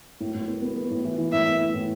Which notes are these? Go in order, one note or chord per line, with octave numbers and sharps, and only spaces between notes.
A2
A2
B3
B3
B3
A2
E3
E3
A2 E5
B3
A2
A2